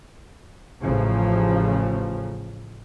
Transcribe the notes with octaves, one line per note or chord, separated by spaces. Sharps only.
A1 C#3 F3